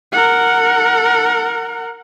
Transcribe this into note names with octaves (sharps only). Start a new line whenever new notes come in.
A#4 F#5